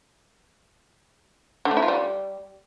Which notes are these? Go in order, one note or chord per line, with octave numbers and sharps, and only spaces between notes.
D3
A3
E4
F4
G3